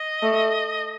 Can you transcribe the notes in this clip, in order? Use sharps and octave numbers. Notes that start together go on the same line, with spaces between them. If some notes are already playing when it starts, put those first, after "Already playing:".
Already playing: D#5
A3